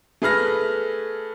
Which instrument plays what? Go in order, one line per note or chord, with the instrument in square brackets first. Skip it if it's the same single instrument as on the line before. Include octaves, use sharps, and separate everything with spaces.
[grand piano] A3 G#4 B4 F6 A#6